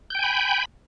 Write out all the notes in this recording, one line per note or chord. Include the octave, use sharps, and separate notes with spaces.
G5 G#5 B5 G6